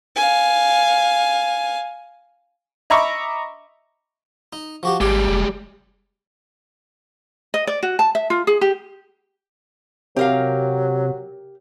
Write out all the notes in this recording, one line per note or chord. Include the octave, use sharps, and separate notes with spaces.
F5 G#5
D#5 E5 A#5 B5 C#6 D6
D#4
F3 F#4 G4
G#1 G3 G#3 G4 G#5
F1
D#5
D5
F#4
A5
E5
F4
G#4
G4
C3 F#3 G4 A#4 F5